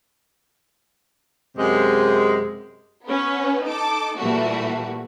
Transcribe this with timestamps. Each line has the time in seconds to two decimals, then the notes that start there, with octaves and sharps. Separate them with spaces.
1.57 F#2 C3 G#3
3.07 B3 C#4 B4
3.64 D#4 A4 D6
4.18 A#2 E3 G3 A3 A#3 F#4